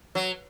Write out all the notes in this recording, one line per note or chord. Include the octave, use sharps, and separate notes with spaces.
F#3